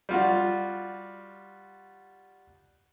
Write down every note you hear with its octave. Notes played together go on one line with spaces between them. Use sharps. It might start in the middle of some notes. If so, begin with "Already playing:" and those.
G3 F4 F#4